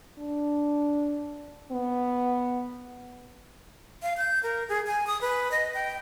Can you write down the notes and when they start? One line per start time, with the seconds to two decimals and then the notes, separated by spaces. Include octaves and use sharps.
0.18 D4
1.71 B3
4.02 F5
4.17 G6
4.43 A#4
4.69 G#4
4.87 G#5
5.07 D#6
5.21 B4
5.51 D#5
5.74 G5